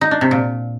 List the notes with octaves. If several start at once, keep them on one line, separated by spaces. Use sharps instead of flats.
D#4
D4
C3
A#2